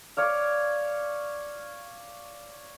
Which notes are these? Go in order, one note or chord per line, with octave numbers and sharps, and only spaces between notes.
C#5 D5 F5